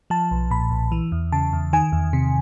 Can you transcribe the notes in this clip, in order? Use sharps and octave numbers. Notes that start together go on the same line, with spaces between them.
F3 A5
B1
A#2 B5
B1
E3
E2
C#3 A5
E2
D#3 G#5
E2
C3